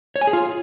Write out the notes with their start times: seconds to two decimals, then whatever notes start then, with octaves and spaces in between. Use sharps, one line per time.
0.16 C#5
0.21 G#5
0.27 G#4
0.33 F4